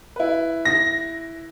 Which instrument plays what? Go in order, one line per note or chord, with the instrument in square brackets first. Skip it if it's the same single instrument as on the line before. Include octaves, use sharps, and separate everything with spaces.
[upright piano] E4 B4
[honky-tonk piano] A#6